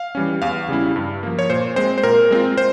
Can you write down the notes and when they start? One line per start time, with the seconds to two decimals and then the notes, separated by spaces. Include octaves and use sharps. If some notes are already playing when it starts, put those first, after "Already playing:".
Already playing: F5
0.15 E3 G3 C#4
0.42 E2 F5
0.68 C#3 G3 C#4 E4
0.96 G2
1.23 F3 A#3
1.39 C#5
1.50 A#2 C5
1.76 G#3 C4 C5
1.98 C5
2.03 A#2 A#4
2.31 G#3 C4 F4
2.58 C5